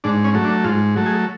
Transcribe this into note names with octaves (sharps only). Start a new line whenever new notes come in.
G#2 D4
C#4
F#3 A3
D4
G#2 F4
F#3 A3
G#4